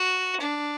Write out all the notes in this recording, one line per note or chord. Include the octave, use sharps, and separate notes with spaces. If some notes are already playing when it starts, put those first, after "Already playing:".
Already playing: F#4
D4